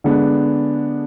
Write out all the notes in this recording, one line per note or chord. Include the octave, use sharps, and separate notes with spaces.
D3 G#3 B3 D4